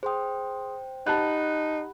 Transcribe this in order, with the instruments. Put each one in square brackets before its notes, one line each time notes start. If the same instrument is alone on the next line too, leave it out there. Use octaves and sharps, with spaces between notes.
[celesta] G#4 C6 D#6 [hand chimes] C5 G5
[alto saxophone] D#4 [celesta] G4 F#5 B5 [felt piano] A5 F#6